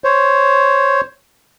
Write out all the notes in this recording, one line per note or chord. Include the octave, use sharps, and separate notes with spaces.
C5 C#5